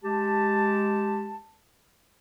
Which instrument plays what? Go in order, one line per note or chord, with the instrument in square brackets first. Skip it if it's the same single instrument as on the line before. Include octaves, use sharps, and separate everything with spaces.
[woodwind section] G#3 G4 A5